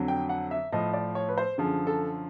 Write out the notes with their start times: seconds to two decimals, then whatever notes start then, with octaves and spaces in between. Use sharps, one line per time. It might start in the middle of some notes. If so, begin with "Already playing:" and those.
Already playing: F2 D3 F#3
0.08 G5
0.29 F#5
0.51 E5
0.72 A2 F3 D#5
0.93 D5
1.15 C#5
1.29 B4
1.38 C5
1.58 F#2 D3 F3 G#4
1.87 A4